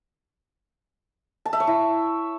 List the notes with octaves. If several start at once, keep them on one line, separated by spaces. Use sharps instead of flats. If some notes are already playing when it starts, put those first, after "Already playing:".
A5
E5
C#5
E4